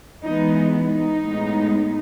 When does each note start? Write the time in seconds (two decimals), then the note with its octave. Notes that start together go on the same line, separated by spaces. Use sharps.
0.24 E3 G#3 B3 D#4
0.72 D#4
1.21 A2 G#3 B3